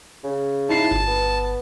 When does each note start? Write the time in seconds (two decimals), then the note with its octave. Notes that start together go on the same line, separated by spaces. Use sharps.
0.24 C#3
0.69 D#4 E4 A5 C7
0.91 G1
1.07 B3